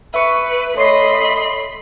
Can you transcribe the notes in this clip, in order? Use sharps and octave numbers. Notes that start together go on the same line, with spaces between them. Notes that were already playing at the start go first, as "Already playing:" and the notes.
B4 E5 C#6 C#7
A3 C#5 D#5 B5 C6 C7